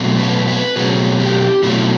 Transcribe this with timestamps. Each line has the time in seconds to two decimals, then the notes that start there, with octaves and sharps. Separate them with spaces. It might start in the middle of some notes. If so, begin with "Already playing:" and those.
Already playing: B2 F#3 A3 C4
0.19 B4
0.47 B4
0.76 B2 F#3 A3 C4 G#4
1.20 G4
1.63 B2 F#3 A3 C4 E4